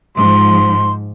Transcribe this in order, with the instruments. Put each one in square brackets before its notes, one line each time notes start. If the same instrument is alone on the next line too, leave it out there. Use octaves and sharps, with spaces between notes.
[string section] G#2 F3 [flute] C6